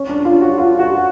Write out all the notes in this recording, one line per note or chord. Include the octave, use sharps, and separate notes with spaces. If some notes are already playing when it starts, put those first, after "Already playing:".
Already playing: C#4
D4
F4
F#4
F4
F#4